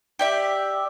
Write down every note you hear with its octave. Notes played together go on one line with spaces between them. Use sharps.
G4 D5 E5